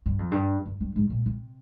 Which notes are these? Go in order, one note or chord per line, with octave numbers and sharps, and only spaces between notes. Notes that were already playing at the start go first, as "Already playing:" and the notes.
G2
F2
G2
F2
G2
G#2
A#2
C3